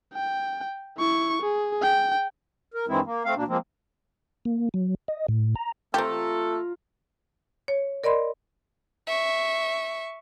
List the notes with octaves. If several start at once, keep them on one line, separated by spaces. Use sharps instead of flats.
G5
E4 C#6
G#4
G5
A#4
G2 D#3 E3 G#3 C4 E4
A#3
A3 C4 F5
D2 B2 A#3 D4
F3 G#3 A#3 C4
A#3
F#3
D#5
A2
A#5
A3 C4 F4 G4 A4 A#5
C#5
A#4 D5 D#5 B5 C6
E5 C#6